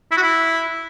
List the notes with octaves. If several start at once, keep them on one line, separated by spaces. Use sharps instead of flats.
E4
F#4
E4